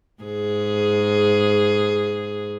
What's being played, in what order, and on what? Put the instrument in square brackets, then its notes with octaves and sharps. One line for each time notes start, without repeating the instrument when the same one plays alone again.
[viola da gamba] G#2 G#4